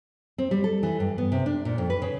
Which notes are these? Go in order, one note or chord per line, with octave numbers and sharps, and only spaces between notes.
C4
G3
A4
E3
G2
B3
C3
D4
A#2
F2
B4
C#3